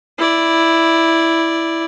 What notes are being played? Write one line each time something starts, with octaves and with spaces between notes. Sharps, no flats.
E4 D5